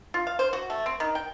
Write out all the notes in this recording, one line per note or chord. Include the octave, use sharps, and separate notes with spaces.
F4
F5
C5
F#4
A3
C4
D#3
G5